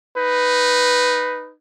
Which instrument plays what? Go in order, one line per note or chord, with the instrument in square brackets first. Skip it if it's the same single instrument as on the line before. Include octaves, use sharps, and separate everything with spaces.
[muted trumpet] D#4 [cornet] B4